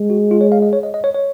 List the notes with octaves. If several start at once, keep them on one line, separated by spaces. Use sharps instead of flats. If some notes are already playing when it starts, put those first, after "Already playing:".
Already playing: G#3
F#4
F4
C#5
F5
D#5
C#5
D#5
D#5
C#5
C#5